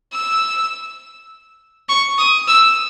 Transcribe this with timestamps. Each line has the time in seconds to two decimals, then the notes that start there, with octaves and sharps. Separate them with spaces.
0.13 E6
1.89 C#6
2.18 D#6
2.48 E6